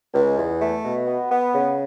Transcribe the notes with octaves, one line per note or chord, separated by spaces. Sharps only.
C#2
E2
A3
B2
B3
B3
C#3